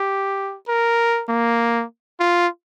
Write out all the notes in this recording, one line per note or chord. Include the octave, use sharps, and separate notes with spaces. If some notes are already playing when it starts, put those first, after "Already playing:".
Already playing: G4
A#4
A#3
F4